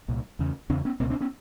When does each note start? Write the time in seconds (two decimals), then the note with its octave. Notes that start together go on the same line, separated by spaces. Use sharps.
0.08 C2 A#2
0.39 E2 C#3
0.70 E2 C#3 C4 D4
0.85 B3 C#4
1.00 C#2 B2 A#3 C4
1.10 C4 D4
1.20 B3 C#4